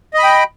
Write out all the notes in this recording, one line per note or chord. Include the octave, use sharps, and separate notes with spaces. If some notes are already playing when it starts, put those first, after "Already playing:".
D#5 G5 B5